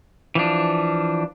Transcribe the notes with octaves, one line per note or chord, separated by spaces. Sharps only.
E3 F3 D4